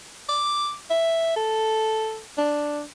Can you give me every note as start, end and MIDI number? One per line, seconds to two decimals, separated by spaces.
0.29 0.74 86
0.90 1.36 76
1.36 2.21 69
2.37 2.82 62